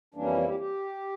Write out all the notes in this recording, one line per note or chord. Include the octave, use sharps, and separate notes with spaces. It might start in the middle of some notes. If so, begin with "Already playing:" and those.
F2 E3 G3 A#3 C#4 D4
E4
E4
G4
G4